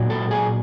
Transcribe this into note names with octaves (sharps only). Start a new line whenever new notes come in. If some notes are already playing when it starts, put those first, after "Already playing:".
Already playing: A#2 F#3
A4
G#4